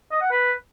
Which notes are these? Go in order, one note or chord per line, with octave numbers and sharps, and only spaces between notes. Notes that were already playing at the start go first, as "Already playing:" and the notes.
D#5
F#5
B4